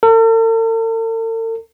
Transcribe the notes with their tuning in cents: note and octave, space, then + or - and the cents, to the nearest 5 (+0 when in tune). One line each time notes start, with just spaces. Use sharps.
A4 +45